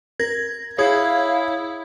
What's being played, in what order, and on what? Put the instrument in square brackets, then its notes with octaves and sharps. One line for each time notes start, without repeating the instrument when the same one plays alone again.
[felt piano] A#4 [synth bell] G#6 A#6
[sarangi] E4 [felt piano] G#4 [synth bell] C#5 D#6 G#6 [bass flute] F5